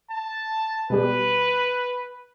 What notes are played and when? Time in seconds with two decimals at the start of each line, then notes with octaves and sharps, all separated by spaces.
0.11 A5
0.90 B2 G3 G4 B4